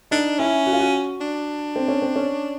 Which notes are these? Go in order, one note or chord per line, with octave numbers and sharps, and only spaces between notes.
D4 D#4
C#4 E4
F#4
F4
F#4
D4
C4
C#4
C4
C#4